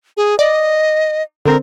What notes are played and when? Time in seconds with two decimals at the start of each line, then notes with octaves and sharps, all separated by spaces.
0.17 G#4
0.39 D5 D#5
1.46 D3 C4 A#4